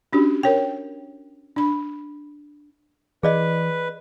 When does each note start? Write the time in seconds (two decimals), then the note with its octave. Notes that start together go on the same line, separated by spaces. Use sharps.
0.13 C#4 D4 F#4 G4
0.43 A#4 C#5 G5
1.56 D4 B5
3.23 E3 G#4 B4 D5 D#5